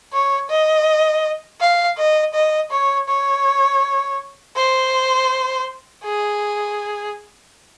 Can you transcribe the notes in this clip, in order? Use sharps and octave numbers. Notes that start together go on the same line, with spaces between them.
C#5
D#5
F5
D#5
D#5
C#5
C#5
C5
G#4